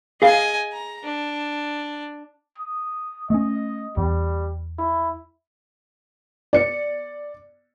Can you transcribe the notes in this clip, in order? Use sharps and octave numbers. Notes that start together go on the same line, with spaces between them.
G#4 D#5 F5 G#5
A#5
D4
D#6
A3 C#4 D#5
E2 G3
E4
D5 C#7